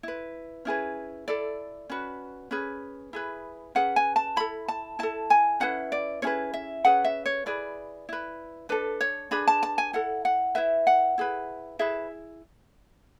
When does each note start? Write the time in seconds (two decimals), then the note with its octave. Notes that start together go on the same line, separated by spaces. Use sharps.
0.03 E4 B4
0.65 C#4 E4 G#4 B4
1.28 E4 A4 D5
1.90 C#4 F#4 B4
2.51 C#4 G#4 B4
3.13 E4 G#4 B4
3.75 C#4 G#4 B4 F#5
3.96 G#5
4.16 A5
4.36 E4 A4 B5
4.68 A5
4.99 E4 A4 A5
5.30 G#5
5.60 C#4 E4 B4 F#5
5.92 D5
6.22 C#4 E4 G#4 B4 C#5
6.54 E5
6.85 C#4 G#4 B4 F#5
7.05 E5
7.26 C#5
7.46 E4 G#4 B4 D5
8.09 E4 B4
8.69 D4 A4 B4
9.01 C#5
9.31 D4 G#4 B4 B5
9.47 A5
9.63 A5
9.78 G#5
9.93 E4 A4 F#5
10.25 F#5
10.55 E4 B4 E5
10.87 F#5
11.18 E4 G#4 B4
11.79 E4 G#4 B4 E5